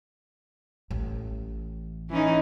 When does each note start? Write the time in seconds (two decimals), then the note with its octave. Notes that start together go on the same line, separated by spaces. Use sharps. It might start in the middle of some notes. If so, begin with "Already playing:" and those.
0.91 A1
2.10 E3 C#4 D#4